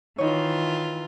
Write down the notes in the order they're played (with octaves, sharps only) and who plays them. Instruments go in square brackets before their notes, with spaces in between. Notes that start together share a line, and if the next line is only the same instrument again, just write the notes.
[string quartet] D#3 E3 F4 [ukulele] D#4 C#5